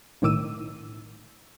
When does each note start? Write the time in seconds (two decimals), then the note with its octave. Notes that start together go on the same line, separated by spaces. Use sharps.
0.22 B1 A2 D#3 D6 E6 D#7